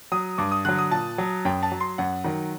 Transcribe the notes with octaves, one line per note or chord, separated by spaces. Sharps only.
F#3 D#6
G2 D6
D#6
D3 F#3 F#6
D#6
A#2 A5
F#3
F#2 G5
A5
F#3
C6
F#2 F#5
D#3 F#3